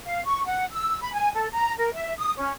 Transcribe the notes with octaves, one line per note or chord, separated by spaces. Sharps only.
F5
C#6
F#5
E6
B5
G#5
A4
A#5
A#4
E5
D#6
C#4